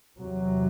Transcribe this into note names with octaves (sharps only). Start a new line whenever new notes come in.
E2 C3 F#3